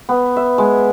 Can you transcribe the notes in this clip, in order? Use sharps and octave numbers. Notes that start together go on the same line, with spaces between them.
B3
E5
G#3